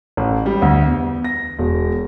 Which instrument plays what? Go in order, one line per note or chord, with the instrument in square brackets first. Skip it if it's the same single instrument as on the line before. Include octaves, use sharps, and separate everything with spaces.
[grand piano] A1
G3
D2
E2
A#6
E1